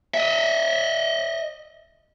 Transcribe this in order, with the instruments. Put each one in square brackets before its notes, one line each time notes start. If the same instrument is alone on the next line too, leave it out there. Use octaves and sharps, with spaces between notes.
[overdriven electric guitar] D#5 E5